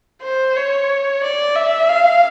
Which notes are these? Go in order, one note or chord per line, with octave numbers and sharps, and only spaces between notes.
C5
C#5
D5
E5
F5